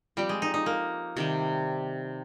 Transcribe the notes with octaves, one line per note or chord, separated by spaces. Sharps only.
F3 G3 C4 G4
G#3
D#4
D#4
A#3
C3 D#3 G3